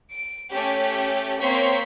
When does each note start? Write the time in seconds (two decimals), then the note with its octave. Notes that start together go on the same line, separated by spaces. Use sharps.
0.12 D7
0.50 A3 C#4 G4
1.40 A#3 C4 C#5 C6 C#6 B6